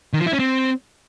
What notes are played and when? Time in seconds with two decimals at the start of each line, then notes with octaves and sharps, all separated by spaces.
0.13 D#3
0.20 F3
0.26 E4
0.33 C#4
0.39 C4